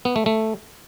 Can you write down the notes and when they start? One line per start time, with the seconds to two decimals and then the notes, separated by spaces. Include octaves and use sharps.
0.05 B3
0.16 A3
0.26 A3